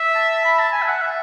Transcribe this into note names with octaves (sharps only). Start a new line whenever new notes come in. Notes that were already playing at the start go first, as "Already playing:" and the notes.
Already playing: E5
A5
B5
A5
G#5
E5
F#5
E5